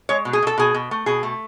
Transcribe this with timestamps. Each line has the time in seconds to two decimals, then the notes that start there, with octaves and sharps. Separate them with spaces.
0.09 G#3 C#5
0.25 B2
0.33 G#4
0.43 B2 A4
0.58 B2 G#4
0.74 B2
0.91 A3
1.06 B2 G#4
1.23 A3